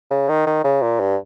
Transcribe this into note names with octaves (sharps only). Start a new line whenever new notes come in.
C#3
D#3
D#3
C#3
A#2
G2